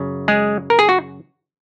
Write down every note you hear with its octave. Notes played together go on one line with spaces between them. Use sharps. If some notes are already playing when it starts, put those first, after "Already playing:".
Already playing: F#2 C#3
G#3 G#4
A#4
G#4
F#4